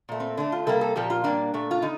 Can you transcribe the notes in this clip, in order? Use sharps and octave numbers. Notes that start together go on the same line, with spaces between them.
A#2 A3
C4
D3 A3 D4
F4
C3 G3 A#3 A4
A4
A#2 F3 A#3 G4
F4
A#2 G3 A#3 D4
A#2 A3
F4
D3 D#4